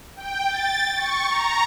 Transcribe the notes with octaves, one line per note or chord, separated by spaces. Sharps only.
G5
A6
C#6
A#5